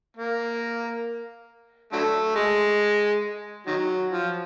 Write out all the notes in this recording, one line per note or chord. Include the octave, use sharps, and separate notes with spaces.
A#3
D3 F#3 A3
G#3
D#3 F#3
F3